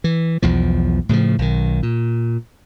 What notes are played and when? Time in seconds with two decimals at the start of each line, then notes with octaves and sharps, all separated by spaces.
0.04 E3
0.42 B1 E2 F3
1.09 A2 C#3 E3 F3
1.39 B1 D#3
1.83 A#2